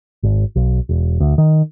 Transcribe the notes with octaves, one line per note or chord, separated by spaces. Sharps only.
G#1
B1
E1
D2
D#3